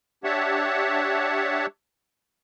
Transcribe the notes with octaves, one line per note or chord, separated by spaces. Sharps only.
D4 G4 C#5 E5 F#5 A5